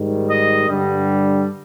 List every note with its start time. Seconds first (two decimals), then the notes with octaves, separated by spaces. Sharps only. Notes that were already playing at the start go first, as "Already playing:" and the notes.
Already playing: G#2 D#3 G3
0.30 D#5
0.69 G2 D3 G3